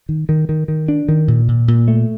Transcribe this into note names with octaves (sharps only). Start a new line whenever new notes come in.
D#3
D#3
D#3
D#3
D4
D#3
A#2
A#2
A#2
A3